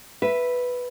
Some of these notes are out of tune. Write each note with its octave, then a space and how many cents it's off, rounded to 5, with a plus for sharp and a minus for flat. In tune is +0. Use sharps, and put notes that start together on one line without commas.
B4 +0 E5 +5